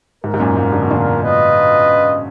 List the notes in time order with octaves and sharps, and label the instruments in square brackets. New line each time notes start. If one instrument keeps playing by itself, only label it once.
[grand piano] G#2 [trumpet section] A#3 F4 A#4
[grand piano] G#2
F#2 A#2
G#2
D3
B2
A#2 D3
[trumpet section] F4 B4 D#5